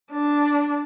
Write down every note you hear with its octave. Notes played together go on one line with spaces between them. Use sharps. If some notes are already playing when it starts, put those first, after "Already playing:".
D4